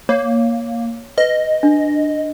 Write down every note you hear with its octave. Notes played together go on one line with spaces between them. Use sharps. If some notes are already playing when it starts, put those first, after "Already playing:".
A#3 C#5
B4 D#5
D4